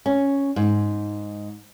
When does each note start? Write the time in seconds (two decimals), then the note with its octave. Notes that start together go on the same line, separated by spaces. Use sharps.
0.06 C#4
0.56 G#2